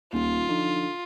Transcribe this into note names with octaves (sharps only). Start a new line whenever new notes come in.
D#1 D2 A#3 F4
D3 F3 D#4